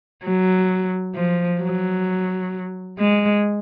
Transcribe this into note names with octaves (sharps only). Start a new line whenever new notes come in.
F#3
F3
F#3
G#3